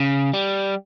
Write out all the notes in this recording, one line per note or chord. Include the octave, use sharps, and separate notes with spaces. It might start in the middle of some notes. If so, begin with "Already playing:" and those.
Already playing: C#3
G3